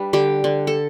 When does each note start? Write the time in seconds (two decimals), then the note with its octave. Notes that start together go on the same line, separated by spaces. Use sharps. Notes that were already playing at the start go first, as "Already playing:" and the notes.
Already playing: G3 D4 B4
0.13 D3 G4
0.44 D3
0.67 A4